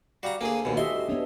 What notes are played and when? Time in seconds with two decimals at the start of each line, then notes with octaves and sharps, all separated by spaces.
0.23 G3 F#4 F5 A#5
0.41 D2 A#3 G#4 G#5
0.65 D#2 B2
0.77 F#4 G4 D#5 E5 C6
1.09 B3 D4 C#5